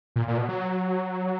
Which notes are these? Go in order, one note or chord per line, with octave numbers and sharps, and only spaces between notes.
A#2
A#2
B2
F#3